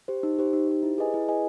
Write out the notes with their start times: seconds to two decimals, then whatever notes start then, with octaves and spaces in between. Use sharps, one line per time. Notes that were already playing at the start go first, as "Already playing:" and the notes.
0.08 G4 C5
0.23 D#4
0.39 G4 C5
0.53 D#4
0.68 G4 C5
0.83 E4
0.98 G#4 B4 D#5 G#5
1.14 E4
1.28 G#4 B4 D#5 G#5